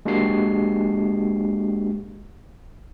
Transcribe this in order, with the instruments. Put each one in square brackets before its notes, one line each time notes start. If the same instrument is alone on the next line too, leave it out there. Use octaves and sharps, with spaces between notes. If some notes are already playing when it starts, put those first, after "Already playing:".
[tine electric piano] G#3 A#3 D4 F#4 G4 C7